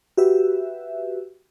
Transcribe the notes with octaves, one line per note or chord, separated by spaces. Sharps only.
F#4 G4 B4 E5